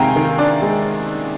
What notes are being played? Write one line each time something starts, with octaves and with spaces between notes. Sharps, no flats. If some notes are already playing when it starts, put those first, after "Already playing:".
Already playing: C3 D#3 G#3 F5 G5 G#5 A#5
D#3
D4 D5
G#3